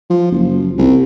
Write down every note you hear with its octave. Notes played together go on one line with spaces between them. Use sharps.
F3
F#1
C2